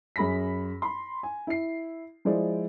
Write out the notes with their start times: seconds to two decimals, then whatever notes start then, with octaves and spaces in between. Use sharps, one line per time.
0.16 F#2 G#4 B5 A#6 B6
0.82 B5 C6
1.23 G#5
1.47 E4 C7
2.25 F3 G#3 E4 C5 D5